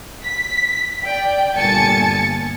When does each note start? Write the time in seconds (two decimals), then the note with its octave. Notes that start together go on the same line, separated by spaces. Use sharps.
0.23 B6
1.03 D5 G5
1.56 G1 A#2 G#5 A5 A6 C#7